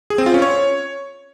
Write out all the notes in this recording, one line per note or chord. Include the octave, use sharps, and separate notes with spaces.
G#4
C4
F4
C#4
C#5